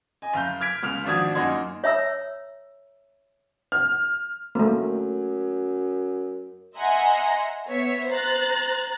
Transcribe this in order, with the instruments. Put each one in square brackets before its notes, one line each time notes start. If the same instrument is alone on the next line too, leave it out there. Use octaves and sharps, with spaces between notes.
[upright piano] D#5 G#5
F#1 F5 G6
F6 G#6 B6 D7
C#2 F6 F7
G#1 F3 D4 F#4 D#6 G#6
F#2 A#3 D#4 F#5 C6 G#6
[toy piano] C#5 E5 A#5 E6
[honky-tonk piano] F6
[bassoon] F#2 [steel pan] A3 A#3
[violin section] D#5 E5 F#5 G#5 A#5 C6
B3 C#5 E5 B6
C5 A#5 F#6 A6